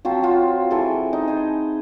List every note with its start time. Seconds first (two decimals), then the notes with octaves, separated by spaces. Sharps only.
0.05 F3 F#3 C4 F4
0.23 F#3 F4
0.71 E3 G#4 A4
1.13 D#4
1.28 C5 G#5